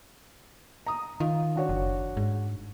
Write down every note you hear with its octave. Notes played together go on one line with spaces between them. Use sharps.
A#5 D#6
D#3 F4
D4 F#4 C#5
F#1
G#2